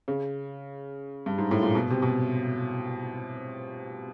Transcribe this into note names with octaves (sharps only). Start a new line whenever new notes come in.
C#3
G2
G#2
A2
A#2
B2
C3
B2